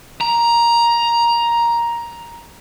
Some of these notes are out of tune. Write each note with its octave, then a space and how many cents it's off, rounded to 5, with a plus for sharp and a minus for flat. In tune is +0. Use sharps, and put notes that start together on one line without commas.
A#5 +10